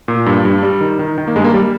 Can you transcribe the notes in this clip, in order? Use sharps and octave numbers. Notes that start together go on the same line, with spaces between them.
A#2
G2
G2
G3
D#3
D#3
D#3
A#3
G2 G#3
A#3
G3